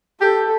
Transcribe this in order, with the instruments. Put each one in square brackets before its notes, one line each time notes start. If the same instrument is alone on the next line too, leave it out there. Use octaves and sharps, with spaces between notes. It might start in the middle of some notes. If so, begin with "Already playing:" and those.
[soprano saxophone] G4 [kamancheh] A4